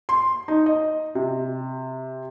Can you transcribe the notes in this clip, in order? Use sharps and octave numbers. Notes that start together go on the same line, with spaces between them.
C6
D#4
D#5
C3